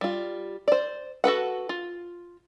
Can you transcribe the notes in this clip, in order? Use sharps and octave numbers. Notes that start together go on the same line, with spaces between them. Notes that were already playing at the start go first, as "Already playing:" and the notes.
G3 F4
C5 D5
F#4 A4 B4 F#5
F4